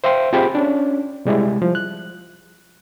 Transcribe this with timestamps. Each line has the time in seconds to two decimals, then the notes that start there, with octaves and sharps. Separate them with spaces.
0.04 C5 E5 F5 G5 C6
0.33 C4 F4 G4 G#4 B5
0.55 C#4 D4
1.25 C3 G3 G#3 E4
1.62 F3
1.75 F#6